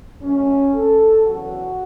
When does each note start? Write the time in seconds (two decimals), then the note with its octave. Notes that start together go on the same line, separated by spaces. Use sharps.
0.21 F#2 F#3 A3 C#4
0.74 A4
1.27 E2 C#3 F#3 F#4